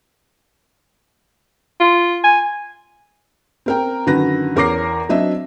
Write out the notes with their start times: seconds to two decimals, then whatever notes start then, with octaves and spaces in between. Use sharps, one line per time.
1.80 F4
2.24 G#5
3.66 C4 A#4 G5
4.06 F#2 D3 D#3 F#4 B4 A#6
4.56 E2 A#4 C#5 D6 A#6 C7
5.09 F#3 C4 D4 D#5 E5